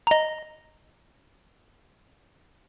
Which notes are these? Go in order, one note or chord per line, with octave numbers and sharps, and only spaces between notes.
D#5 A#5